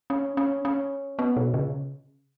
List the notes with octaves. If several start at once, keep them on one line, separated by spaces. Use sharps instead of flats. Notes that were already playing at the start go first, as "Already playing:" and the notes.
C#4
C#4
C#4
B3
B2
C#3